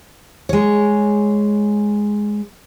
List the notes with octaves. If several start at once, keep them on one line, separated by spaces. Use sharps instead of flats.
G#3 C#5